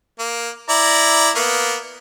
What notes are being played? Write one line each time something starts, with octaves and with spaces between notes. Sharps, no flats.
A#3
E4 D5 A#5
A#3 B3